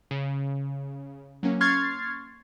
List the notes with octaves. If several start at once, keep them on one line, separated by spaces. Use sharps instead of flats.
C#3
F#3 A#3 C#4
C6 C#6 F6 G#6 A6 C7